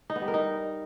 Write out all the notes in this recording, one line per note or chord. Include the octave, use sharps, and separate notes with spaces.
D#4
B3
G3
A#4
D#4